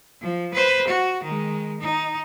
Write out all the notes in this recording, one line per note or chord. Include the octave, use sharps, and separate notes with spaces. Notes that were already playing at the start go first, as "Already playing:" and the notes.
F3
B4 C5
F#4
D#3 G#3
D#4